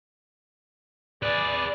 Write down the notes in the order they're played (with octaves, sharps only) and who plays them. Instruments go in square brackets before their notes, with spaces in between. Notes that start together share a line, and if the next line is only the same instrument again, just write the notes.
[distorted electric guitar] G#4 B4 [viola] D5